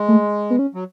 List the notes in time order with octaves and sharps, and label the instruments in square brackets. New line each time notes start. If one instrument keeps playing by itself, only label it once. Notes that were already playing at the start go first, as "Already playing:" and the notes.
Already playing: [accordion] G#3
[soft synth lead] A3
B3
C#4
[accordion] F#3